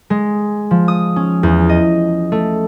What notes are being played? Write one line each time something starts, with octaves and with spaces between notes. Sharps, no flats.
G#3
F3
D#6
C#4
E2
D#5
A3